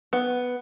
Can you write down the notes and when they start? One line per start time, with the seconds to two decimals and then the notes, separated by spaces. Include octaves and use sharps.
0.13 B3